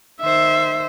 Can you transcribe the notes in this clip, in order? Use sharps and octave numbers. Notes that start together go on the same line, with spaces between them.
D#3 C5 E5